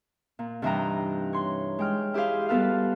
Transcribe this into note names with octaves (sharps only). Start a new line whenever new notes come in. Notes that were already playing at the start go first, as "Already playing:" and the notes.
A#2
G2 C3 E3 D#4 G5 A#5
C#5 C6
G#3 G5 F6
E4 G4 G#4 C5 F5
G3 B3 F4 A4 B4 F5